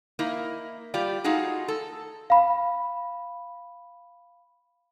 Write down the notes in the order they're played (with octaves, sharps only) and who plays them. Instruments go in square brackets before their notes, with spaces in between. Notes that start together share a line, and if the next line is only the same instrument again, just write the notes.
[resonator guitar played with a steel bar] A#3 D#4 E4
G3 F4 G4 D5
A3 D#4 F4 F#4 G#4
A4
[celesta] F5 B5